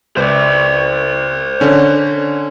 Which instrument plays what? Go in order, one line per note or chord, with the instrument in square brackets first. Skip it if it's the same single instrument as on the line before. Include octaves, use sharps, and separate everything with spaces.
[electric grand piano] C#2 B4 [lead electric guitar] C5 D5
[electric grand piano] D3 C#4 C#5